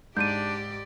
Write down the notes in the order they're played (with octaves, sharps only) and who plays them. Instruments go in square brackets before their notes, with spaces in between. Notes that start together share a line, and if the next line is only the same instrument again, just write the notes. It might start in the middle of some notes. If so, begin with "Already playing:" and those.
[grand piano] G#2 [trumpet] D4 [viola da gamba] G4 D5 [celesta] G6 D#7